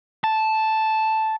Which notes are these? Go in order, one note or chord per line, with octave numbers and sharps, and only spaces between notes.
A5